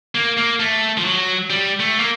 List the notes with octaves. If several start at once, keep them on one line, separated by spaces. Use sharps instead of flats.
A#3
A#3
A3
F3
F#3
G3
A3
A#3